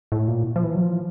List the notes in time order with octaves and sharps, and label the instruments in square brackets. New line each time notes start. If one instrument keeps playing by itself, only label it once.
[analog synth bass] A2
A#2
F3
E3
F#3
F3